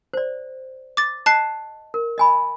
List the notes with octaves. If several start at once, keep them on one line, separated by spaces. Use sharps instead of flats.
C5 D5
D6 A6
D#5 A5 F#6 C7
A#4
D#5 G#5 B5